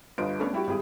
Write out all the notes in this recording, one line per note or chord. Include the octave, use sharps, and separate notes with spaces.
G1 G2 F4 B4 D#5 D7
A3 B3 C#4 D4
G3 E4 F#4 G4
G#1 G3 E4 G4 G#4